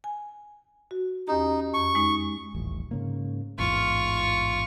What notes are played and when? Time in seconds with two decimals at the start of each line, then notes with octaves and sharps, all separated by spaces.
0.04 G#5
0.91 F#4
1.28 E2 C#4 D#4 G4
1.74 F2 C#6
1.95 G#3 D#4
2.54 D#1 A1
2.91 G#2 C#3 A#3
3.59 A1 E2 G#2 F4 C#6